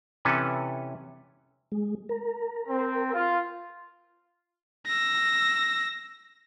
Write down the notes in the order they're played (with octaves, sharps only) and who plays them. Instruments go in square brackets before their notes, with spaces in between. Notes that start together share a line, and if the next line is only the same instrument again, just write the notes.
[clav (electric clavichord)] C3 E3 C#4 A4 B4
[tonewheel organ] G#3
A#4
[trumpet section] C4
F4
[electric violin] E6 A#6